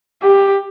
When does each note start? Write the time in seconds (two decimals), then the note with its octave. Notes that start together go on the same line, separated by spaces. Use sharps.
0.23 G4